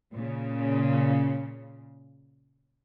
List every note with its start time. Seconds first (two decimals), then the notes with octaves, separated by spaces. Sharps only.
0.14 A#2 C#3